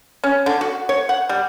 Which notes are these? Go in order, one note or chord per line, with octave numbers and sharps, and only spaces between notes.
C#4
D3
F#4
C#5
F#5
G3